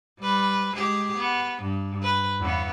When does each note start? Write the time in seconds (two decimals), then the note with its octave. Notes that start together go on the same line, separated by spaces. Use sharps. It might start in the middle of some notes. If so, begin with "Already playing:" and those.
0.20 G3 B4
0.75 G#3 G4 G#4
1.17 B3
1.62 G2
2.02 B4
2.40 E2 C#3 B3